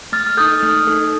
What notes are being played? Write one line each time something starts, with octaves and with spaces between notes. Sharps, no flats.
A3 F6 A6
F6
D#4 A4 D#6 G6
A3
D#4 A4